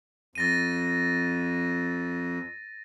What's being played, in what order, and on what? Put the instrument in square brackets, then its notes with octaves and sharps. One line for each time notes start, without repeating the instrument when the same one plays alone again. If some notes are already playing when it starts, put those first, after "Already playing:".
[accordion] F2 [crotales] A6 A#6 D#7